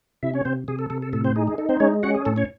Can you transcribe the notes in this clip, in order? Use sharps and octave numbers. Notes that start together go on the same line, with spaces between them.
C3 E4 E5
C#4 C#5
C3 C4 C5
C3 G#4
A4
C3 A4
A4
A2 A4
C4 C5
D#4 G#4
G#4
D#4 A4
C4 C5
G#3 C#4 C#5
C#4 F#4 F#5
G#4
A2 A4
C#4 C#5